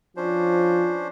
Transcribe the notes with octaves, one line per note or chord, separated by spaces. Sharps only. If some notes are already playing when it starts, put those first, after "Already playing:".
F3 C#4 D4 C5